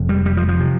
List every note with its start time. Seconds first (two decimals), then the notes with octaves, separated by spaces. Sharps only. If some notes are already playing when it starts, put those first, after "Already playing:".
Already playing: F1 F2 C#3
0.09 G3
0.25 G3
0.37 F3
0.48 F3
0.60 C3